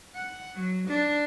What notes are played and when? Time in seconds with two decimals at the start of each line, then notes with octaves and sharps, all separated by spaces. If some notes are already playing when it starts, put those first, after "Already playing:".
0.15 F#5
0.55 F#3
0.88 D4